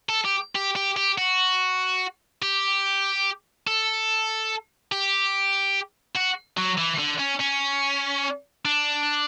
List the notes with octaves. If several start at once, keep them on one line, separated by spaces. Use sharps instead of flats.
A4
G4
G4
G4
G4
F#4
G4
A4
G4
F#4
F#3
E3
D3
C#4
C#4
D4